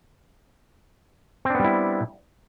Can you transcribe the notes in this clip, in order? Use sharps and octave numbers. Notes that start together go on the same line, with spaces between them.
G3 B3 C4 D4 E4